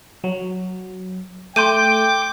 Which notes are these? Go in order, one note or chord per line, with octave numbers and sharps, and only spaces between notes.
F#3
A3 G5 C6 D6 G6 D#7